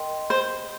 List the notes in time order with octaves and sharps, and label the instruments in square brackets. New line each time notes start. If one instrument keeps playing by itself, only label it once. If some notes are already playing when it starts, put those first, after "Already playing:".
Already playing: [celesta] A#4 D#5 G5 C6
[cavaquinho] C5